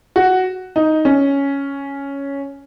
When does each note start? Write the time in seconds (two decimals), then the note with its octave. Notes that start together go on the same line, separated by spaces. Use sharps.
0.16 F#4
0.76 D#4
1.05 C#4